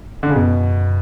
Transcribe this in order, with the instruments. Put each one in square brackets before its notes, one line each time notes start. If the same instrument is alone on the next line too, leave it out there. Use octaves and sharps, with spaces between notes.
[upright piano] D3
C#3
[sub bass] F#2 [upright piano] B2